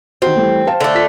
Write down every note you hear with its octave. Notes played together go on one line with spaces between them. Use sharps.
D#3 C4 F#4
E3 G3 A3
C5 F5 A5
D3 A3
F4 E6 B6